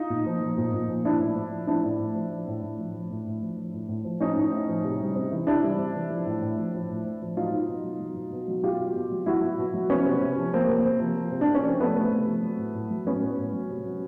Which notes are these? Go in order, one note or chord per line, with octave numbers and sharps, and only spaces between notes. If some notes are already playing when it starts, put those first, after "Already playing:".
Already playing: D#4 F4
A#2
F3
F3
A#2
A#2
F3
F3 D4 E4
A2
A2
F3
F3 D4 E4
A2
A2
F3
F3
A2
A2
F3
F3
A2
A2
F3
F3
A2
A2
F3
F3 C#4 D#4
A2
A2
F3
C3
G3
C3
E3
C3 D4 E4
G3
C3
E3
F3
A2
A2
F3
F3
A2
A2
F3
F#3 D#4 F4
B2
B2
F#3
F#3
B2
B2
F#3
F#3 F4 G4
B2
B2
F#3
F#3 E4 F#4
B2
B2
F#3
F3 B3 C#4
C3
C3
F3
F3 A#3 C4
C3
C3
F3
F3
C3
D4
C3
C#4
F3 C4
F3 A3 B3
C3
C3
F3
F#3
A2
A2
F#3
F#3 B3 C#4
A2
A2
F#3
C3
F#3